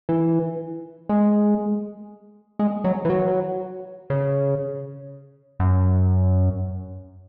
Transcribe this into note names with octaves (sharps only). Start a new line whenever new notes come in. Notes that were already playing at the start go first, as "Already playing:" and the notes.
E3
G#3
G#3
F#3
E3
F#3
C#3
F#2